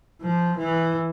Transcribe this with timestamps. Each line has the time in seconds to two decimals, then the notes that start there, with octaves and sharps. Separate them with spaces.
0.22 F3
0.58 E3